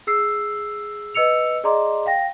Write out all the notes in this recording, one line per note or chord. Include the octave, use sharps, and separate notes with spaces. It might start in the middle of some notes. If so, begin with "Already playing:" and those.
G#4 E6 C7
B4 D#5 E6 C#7 F7
G#4 D5 D#5 A#5 C6 D6
F5 G5 A#6